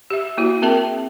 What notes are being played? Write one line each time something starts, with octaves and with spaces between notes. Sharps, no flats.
G4 E5
A#3 E4 F#4
C4 G#4 A#4 E5 G5 A5